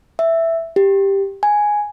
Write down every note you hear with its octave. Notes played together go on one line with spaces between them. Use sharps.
E5
G4
G#5